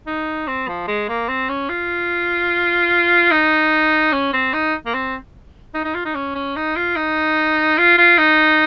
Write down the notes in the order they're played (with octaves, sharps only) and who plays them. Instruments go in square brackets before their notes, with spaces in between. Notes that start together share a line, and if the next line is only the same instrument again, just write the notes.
[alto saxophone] D#4
C4
F3
G#3
A#3
C4
C#4
F4
D#4
C#4
C4
D#4
A#3
C4
D#4
D#4
F4
D#4
C#4
C#4
D#4
F4
D#4
F4
F4
D#4